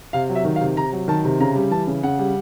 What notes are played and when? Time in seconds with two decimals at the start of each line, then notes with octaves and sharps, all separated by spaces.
0.13 C3 F5
0.29 F#3
0.35 E5
0.45 D#3
0.56 F5
0.61 C3
0.76 C3 A#5
0.92 F#3
1.08 D#3 A5
1.25 C3
1.40 C#3 A#5
1.55 G3
1.71 E3 A5
1.87 C#3
2.03 C#3 F#5
2.19 G3